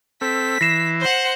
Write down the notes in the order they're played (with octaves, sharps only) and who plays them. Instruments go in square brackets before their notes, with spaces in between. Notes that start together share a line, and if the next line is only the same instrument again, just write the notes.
[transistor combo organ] C4 A4 [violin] B6
[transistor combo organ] E3 [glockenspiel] A#6 C7 E7
[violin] C5 F#5